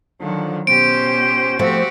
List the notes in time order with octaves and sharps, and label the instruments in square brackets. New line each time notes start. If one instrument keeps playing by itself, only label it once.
[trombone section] D3 F3 [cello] D#3 F#3
[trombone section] C#2 C#4 C5 [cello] B2 G4 [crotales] D7
[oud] F3 A3 [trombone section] C4 [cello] F#4 G4